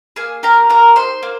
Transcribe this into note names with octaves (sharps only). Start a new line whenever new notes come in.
A#3 G#4 G#5
G4 A#4 A#5
A#3 A#4 A#5
D#4 C5 C6
A#3